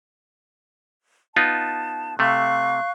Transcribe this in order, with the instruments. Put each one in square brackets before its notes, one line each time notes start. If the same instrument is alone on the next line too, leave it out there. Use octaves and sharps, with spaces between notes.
[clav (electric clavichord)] B3 D#4 F4 [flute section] A5
[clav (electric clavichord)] C3 A3 [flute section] F5 C#6 F#6